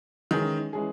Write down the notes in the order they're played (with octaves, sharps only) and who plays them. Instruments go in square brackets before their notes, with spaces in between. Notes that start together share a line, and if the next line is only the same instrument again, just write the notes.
[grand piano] D#3 [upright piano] E3 G#3 C#4 G#4
[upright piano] E3 G#3 C#4 G#4